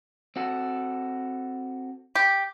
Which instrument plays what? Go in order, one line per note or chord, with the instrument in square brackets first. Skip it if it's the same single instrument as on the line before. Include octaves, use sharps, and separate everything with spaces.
[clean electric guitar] C4 F#4 A4
[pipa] G4